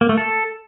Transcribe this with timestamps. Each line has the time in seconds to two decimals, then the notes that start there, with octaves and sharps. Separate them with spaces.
0.01 A#3
0.09 A3
0.17 A4